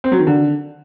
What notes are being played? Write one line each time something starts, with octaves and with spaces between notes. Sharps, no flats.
C4
F#3
D#3
D3